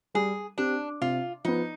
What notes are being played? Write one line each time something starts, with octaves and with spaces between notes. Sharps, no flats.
G3 G#4
C4 D4 G4
C3 F4
F3 B3 D#4